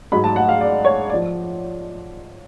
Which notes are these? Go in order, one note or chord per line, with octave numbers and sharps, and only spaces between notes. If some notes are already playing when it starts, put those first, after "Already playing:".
G#2 F#3 B5
A5
F#5
F5
D5
C#5
D5
F3